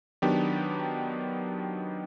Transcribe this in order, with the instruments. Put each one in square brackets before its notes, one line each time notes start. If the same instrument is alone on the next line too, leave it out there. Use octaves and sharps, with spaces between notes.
[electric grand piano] D#3 F#3 B3 D4 G4